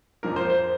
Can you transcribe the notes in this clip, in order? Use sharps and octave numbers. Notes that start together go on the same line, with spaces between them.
F2 F3 A#3 A#4
C5
C5